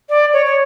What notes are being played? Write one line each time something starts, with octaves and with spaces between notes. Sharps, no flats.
D5
C#5
C#5